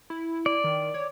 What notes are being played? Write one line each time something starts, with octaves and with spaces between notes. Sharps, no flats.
E4
D5
D#3
C#5